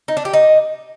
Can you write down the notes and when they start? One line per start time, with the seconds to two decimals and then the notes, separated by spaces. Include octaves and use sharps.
0.08 D#4
0.17 D4
0.25 G4
0.33 D#4